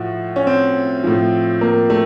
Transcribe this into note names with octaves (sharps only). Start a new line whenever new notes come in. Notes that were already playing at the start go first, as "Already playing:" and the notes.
Already playing: A2 F3 F#4
C#4
C4
A2 F3
A#3
A3